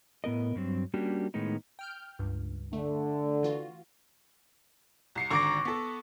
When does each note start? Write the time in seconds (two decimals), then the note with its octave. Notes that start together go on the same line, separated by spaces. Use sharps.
0.24 A2 B3 A#4 D#5
0.55 G2 F#3 C4
0.94 G3 A#3 C#4 D4 F#4 G4
1.34 A2 D#3 G#3 B3 D#4
1.79 G5 F6 G6
2.19 C#2 G2
2.73 D3 A3
3.43 E3 F4 F#4
5.15 C2 C7 C#7
5.30 G#1 D3 A#5 C#6 D6 A#6
5.65 B3 A4